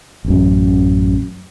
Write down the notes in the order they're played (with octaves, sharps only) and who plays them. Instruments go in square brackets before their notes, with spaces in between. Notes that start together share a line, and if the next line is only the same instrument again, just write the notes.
[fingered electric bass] A1 F#2